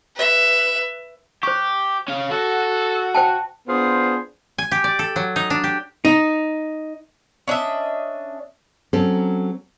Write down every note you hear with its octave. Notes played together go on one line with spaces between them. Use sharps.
B4 E5
G4 C5 C#6
C#4 F5
F#4 A4
C5 G5 A5
B3 D4 F4 G#4 C5
G#5
G4
D5
A4
F#3
D#4
D4
G4
D#4
C#4 D4 D#5 E5
F#3 C4 C#4 A4